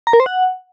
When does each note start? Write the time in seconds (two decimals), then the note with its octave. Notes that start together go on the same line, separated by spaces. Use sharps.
0.07 A#5
0.13 A#4
0.20 C5
0.26 F#5